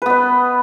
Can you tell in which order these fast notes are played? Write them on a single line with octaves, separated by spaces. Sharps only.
B4 B3 D#5